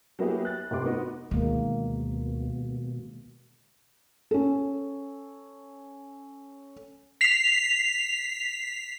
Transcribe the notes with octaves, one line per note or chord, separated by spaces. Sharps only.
F#3 A#3 B3 E4 G4 G#4
F#6 A6
F1 C4 G4 C6 D6
B3 D#4 F#4
D2 B2 D#3 G#3 A#3
C#4 A4
B6 C7 F7